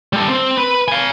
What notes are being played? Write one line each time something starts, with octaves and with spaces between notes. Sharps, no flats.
G3 A4
C4
B4
F5 G#5